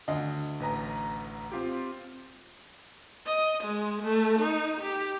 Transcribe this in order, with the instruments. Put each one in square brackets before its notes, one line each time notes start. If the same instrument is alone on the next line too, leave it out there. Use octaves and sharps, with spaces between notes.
[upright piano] D2 D#5
[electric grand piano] A1 B4 A#5
C4 F4 G4
[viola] D#5
G#3
A3
D#4
G4